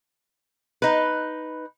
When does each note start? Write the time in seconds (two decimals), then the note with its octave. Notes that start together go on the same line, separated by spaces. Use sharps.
0.82 D#4 B4